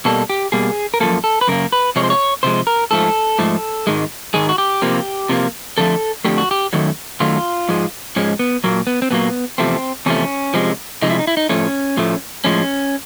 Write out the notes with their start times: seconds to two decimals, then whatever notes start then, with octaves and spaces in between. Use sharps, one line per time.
0.05 B2 G3 A#3 A4
0.30 G4
0.52 B2 G3 A#3 G#4
0.94 A#4
1.00 F#2 C#3 F3 A#3 A4
1.24 A4
1.41 B4
1.48 F#2 C#3 A#3 A#4
1.73 B4
1.96 C3 F3 G#3 C#5
2.03 C5
2.10 C#5
2.43 C3 F3 G#3 C5
2.67 A#4
2.91 G#2 F3 A3 A4
3.39 G#2 F3 A3
3.87 G#2 D#3 G#3
4.34 G#2 D#3 G#3 G#4
4.49 F#4
4.58 G4
4.82 C3 F3 A#3
5.29 C3 F3 A#3
5.78 F2 D3 F3 A3 A4
6.25 F2 D3 F3 A3 G4
6.38 F#4
6.51 G4
6.73 F#2 D#3 F#3 A3
7.20 F#2 D#3 F#3 A3 F4
7.69 G#2 F3 G#3
8.16 G#2 F3 G#3 C#4
8.39 B3
8.64 A#2 F#3 A#3
8.87 B3
9.02 C4
9.11 A#2 F#3 A#3 B3
9.58 E2 C3 F3 A3 C4
10.06 E2 C3 F3 A3 C#4
10.54 C3 F3 G#3
11.02 C3 F3 G#3 D#4
11.10 E4
11.19 D#4
11.27 E4
11.37 D#4
11.49 A2 F3 A3 C#4
11.97 A2 F3 A3
12.44 A2 F3 G#3 C#4